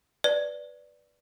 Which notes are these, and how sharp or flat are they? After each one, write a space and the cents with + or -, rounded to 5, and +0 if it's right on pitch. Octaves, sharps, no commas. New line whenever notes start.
B4 +0 D5 +0